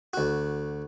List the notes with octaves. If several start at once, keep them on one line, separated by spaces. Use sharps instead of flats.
D2 F#4